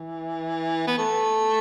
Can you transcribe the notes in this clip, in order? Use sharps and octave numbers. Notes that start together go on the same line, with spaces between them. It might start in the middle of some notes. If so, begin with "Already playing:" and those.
Already playing: E3
B3
A3